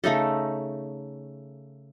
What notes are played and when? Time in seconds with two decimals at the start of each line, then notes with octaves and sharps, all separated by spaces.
0.04 C#3 A3 D#4 A4